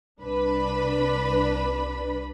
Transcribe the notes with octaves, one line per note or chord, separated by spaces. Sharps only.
C2 D4 B4 B5